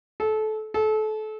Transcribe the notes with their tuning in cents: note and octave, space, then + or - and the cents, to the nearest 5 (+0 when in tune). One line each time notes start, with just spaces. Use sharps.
A4 -25
A4 -30